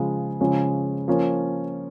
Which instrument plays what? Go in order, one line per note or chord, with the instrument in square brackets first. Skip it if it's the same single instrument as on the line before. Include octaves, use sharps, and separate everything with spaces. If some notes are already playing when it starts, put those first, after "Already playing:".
Already playing: [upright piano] C#3 F3 G#3
C#3 F3 G#3 C#4
F3 A#3 C#4